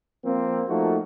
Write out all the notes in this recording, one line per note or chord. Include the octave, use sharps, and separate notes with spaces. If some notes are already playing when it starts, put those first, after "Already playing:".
F3 A#3 C4
F3 A3 A#3 D#4 F#4